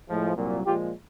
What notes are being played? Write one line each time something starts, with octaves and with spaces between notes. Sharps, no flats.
A2 F3 G#3
C2 A#2 F#3
A#2 F3 G#3 F4 G4